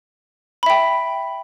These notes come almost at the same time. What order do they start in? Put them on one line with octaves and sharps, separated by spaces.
B5 E5 G5